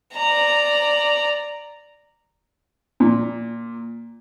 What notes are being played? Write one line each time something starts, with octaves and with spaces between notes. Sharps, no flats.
D5 A#5
A#2